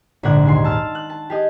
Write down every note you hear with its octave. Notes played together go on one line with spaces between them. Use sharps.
A#1 G#2 D3 D4 F#5 G#6
D#2 G#5 C6
A5 E6 F6 A6
F#6
A5
G4 G#4 D#5